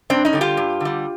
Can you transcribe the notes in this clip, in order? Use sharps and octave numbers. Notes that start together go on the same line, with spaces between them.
G2 C4 D4
C#4 D#4
D3 G3
F4 G4
G2
D3 G3